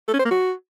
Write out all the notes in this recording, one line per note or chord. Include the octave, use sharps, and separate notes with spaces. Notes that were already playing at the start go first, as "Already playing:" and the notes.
A4
C#4
C5
A#3
F#4